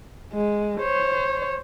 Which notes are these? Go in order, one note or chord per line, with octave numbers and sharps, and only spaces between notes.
G#3
C5 C#5